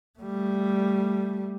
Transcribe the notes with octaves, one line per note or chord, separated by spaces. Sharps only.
G3 A3